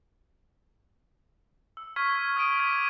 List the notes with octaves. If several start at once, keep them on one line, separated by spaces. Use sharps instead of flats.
E6
C#6 F6 G#6 B6
D#6 F6 G#6 D7 D#7
D6 G#6 B6